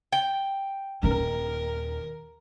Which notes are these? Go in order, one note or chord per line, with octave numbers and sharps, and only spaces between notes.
G5
D#1 D#3 A#4